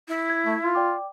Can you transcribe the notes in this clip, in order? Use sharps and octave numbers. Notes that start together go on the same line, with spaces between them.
E4
G#6
A3
F4
D5 G5 D6